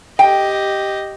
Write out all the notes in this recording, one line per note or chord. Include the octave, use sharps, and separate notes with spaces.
G4 D#5 G5